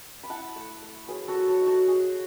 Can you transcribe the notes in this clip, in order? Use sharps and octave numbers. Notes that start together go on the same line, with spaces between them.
B5
E4 F#5 A5
A3
A3
F#3 G#4 B4
F#4 A4
F#3
A4 C#5
D#4
F#4 A4
D#4 G#4